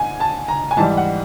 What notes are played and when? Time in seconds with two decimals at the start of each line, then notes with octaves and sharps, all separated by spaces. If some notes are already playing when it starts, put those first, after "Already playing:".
Already playing: G#2 G#5
0.20 A5
0.48 A#5
0.71 G#5
0.77 G#2 E3 G3 A5
0.97 F#5